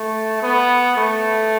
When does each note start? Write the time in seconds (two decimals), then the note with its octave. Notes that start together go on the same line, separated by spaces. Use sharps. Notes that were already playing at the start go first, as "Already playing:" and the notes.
Already playing: A3
0.42 B3
0.96 A3